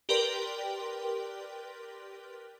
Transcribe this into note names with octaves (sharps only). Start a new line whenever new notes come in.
G4 A#4 B4 D5 G5 C6